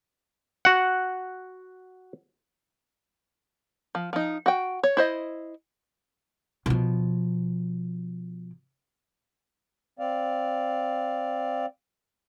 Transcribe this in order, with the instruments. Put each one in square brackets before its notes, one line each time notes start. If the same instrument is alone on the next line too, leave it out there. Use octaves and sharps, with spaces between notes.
[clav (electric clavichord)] F#4 F#5
[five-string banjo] F3
F3 D#4
F#4 G5
C#5
E4 C5 D#5
[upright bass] B2 F3
[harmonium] C4 D5 F5